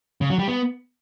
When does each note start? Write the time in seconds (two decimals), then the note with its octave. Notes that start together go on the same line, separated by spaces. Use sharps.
0.21 C#3
0.30 F#3
0.39 G3
0.48 B3